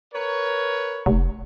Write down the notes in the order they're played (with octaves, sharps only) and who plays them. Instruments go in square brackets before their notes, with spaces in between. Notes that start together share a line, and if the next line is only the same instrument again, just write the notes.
[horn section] A#4 B4 C#5
[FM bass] F1